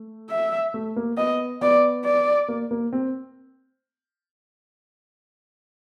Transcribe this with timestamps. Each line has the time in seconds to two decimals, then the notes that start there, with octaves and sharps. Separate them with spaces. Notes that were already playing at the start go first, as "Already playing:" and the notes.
Already playing: A3
0.30 E5
0.74 A3
0.96 A#3
1.17 B3 D#5
1.61 B3 D5
2.05 D5
2.48 A#3
2.71 A#3
2.93 C4